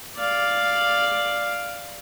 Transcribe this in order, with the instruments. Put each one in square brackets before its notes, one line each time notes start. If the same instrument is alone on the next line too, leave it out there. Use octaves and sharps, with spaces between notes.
[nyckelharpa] D5 F5